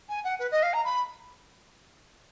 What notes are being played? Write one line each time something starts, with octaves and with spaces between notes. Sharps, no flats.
G#5
F#5
B4
D#5
F5
A#5
B5